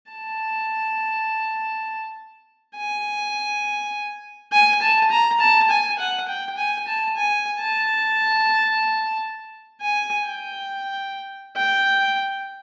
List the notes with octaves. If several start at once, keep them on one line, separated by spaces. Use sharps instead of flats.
A5
G#5
G#5
A5
A#5
A5
G#5
F#5
G5
G#5
A5
G#5
A5
G#5
G5
G5